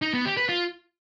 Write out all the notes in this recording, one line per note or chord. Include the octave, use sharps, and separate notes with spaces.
D#4
B3
G4
B4
F4